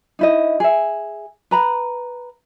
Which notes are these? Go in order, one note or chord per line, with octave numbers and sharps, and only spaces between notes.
D#4 E4 D#5
G#4 E5
B4 A#5 B5